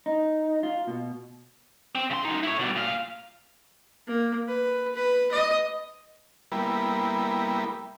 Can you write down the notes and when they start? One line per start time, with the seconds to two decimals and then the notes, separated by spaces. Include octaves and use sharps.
0.06 D#4
0.63 F4
0.87 B2
1.95 C4
2.10 C#3 C6
2.25 F#2 D#4
2.43 E4 C#5
2.59 B2 G3
2.75 A#2 F5
4.08 A#3
4.48 B4
4.95 B4
5.32 D#5
6.52 G3 A#3 B3 E4